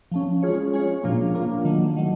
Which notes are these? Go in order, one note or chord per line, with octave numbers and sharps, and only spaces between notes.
F3 A3 C#4
G#3 C#4 F4 G#4 C#5
G#3 C#4 F4 G#4 C#5
A#2 F3 A#3 D4 F4
A#2 F3 A#3 D4 F4
D#3 F#3 A3
D#3 F#3 A3